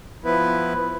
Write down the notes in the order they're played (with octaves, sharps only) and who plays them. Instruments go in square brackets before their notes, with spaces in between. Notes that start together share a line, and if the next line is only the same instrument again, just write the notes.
[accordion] F3 B3 E4 B4